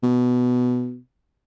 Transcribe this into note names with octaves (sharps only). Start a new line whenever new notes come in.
B2